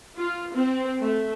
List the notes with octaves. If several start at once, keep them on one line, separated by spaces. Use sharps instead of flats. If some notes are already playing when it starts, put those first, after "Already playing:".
F4
C4
A3